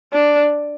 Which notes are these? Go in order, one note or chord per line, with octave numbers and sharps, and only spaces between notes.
D4